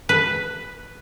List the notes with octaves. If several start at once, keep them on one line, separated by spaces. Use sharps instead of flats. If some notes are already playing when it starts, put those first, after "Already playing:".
B4